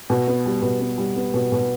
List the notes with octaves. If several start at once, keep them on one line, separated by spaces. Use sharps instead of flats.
B2
B3
G3
B2
B3
G3
B3
B2
B2